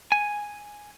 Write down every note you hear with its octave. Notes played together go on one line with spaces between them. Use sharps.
G#5